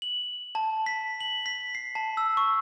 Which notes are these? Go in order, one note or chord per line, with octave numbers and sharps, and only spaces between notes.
F#7
A5
B6
F#7
B6
C7
A5
E6
C#6